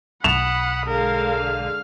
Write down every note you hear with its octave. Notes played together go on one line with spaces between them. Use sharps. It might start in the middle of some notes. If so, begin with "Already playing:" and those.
B1 F#5 B5 D#6 E7 F7
D3 G#3 A#4 F5
F6